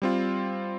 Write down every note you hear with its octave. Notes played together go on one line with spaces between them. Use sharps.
G3 C4 F4